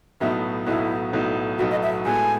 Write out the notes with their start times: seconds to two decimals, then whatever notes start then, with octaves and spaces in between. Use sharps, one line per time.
0.20 B1 A2 F#3 B3 D#4 E5
0.66 B1 A2 F#3 B3 D#4 E4
1.13 B1 A2 F#3 B3 D#4
1.58 B1 A2 F#3 B3 D#4 F#4
1.71 D#5
1.83 E5
2.05 A2 G#3 B3 F#4 A4 G#5